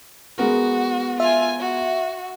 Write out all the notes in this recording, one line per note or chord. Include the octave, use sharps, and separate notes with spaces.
G#3 B3 F#4 A#4
F4 E5 G#5
F#4